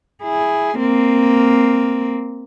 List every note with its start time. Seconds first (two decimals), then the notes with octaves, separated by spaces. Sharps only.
0.23 E4 G#4
0.78 A#3 C4